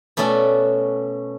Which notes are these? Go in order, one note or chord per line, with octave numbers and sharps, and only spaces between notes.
B2 A3 C#4 F#4 D5